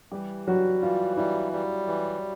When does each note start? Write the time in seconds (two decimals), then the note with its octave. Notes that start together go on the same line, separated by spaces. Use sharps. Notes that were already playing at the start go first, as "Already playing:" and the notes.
0.11 E3 G3 G4
0.47 F#3 G3 F#4
0.82 E3 F4
1.17 G3 E4
1.52 G3
1.87 E3